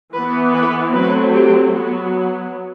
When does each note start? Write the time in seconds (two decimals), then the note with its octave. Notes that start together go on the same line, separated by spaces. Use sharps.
0.13 E3 B3 B4
0.53 B4
0.93 F#3 A3 C4 B4
1.33 G4
1.73 F#3 B3 F#4